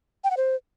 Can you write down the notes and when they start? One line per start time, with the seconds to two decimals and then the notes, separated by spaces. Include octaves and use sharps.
0.24 G5
0.31 F#5
0.37 C5